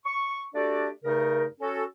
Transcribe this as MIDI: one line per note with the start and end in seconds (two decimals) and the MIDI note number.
0.05 0.43 85
0.55 0.88 57
0.55 0.88 62
0.55 0.88 66
0.55 0.88 67
0.55 0.88 69
0.55 0.88 74
1.04 1.45 43
1.04 1.45 49
1.04 1.45 57
1.04 1.45 63
1.04 1.45 70
1.61 1.83 61
1.61 1.83 66
1.61 1.83 69